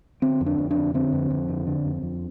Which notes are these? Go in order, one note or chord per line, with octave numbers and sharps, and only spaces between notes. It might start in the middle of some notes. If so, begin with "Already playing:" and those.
D3 C4
F2
D4
F2
D4
D3
D3 C4
F2
F2
D3
D3
F2
F2